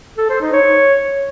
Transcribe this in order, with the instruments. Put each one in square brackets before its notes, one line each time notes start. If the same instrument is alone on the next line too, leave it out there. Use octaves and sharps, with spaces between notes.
[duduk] A4
C5
D#4
C#5